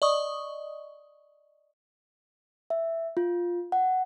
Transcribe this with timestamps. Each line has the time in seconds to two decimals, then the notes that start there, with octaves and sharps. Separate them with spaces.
0.02 D5 D#5 C#6 D#6
2.70 E5
3.17 F4
3.72 F#5